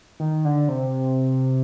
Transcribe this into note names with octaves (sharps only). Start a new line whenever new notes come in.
D#3
D3
C3